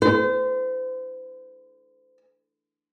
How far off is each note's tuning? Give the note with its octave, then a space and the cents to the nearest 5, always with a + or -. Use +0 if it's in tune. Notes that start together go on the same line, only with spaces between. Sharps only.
C5 -35